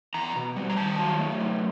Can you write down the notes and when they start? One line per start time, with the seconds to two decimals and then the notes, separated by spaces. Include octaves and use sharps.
0.14 E2 A#5
0.36 B2
0.56 G3
0.70 A#5
0.77 D#3 A5
0.99 F#3
1.19 A3
1.41 F#2